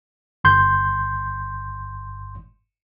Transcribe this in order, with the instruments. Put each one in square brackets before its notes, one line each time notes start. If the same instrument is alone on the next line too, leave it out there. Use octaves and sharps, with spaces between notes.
[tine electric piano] G1 C6 G6